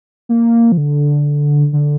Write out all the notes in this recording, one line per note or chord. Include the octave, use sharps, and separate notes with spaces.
A#3
F3
D3
D3